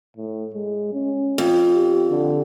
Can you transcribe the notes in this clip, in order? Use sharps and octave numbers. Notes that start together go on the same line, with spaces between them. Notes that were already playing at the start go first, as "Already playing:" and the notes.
A2
G#3
C#4
F2
G4
D3